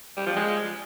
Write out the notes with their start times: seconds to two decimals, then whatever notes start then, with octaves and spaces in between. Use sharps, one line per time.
0.16 G3
0.26 F3
0.36 G#3